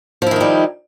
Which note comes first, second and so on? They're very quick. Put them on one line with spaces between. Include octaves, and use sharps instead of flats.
F3 E4 D#3 D#4 G3